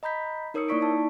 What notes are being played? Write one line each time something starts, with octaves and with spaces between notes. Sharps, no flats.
D#5 A#5 B5 G6 B6
D#4 A#4 C#5 D#6 E6 C#7
A#3 E4 D5 C#6 B6 D7
D#4 A5